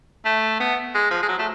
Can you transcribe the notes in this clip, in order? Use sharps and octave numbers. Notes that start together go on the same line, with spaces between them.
A3
B3
G#3
F3
G#3
F#3
A3